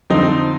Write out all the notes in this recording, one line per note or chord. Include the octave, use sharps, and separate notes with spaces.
F2 D3 F3 C4 D#4